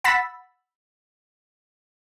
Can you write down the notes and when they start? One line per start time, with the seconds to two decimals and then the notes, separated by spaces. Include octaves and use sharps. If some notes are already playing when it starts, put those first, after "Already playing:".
0.04 F#5 B5 E6 A6 B6